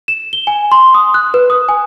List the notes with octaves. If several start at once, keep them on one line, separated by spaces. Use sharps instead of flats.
E7
G7
G#5
C6
D#6
F#6
B4
D#6
G#5